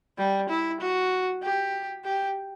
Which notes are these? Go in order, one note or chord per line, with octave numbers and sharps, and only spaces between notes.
G3
E4
F#4
G4
G4